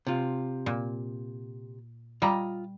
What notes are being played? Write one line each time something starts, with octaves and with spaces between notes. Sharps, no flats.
C3 F4
A#2
G3 F4 D#5 A#5